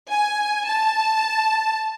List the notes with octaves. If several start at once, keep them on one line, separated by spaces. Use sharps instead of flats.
G#5
A5